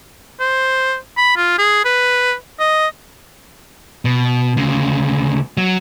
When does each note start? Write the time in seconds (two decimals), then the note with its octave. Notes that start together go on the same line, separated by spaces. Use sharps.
0.40 C5
1.17 B5
1.36 F4
1.58 G#4
1.85 B4
2.60 D#5
4.05 B2
4.57 D2 C#3
5.57 F#3